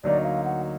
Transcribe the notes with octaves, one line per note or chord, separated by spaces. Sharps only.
D2 D3 F#3 A#3 D#4 D5
D#5
F5
F#5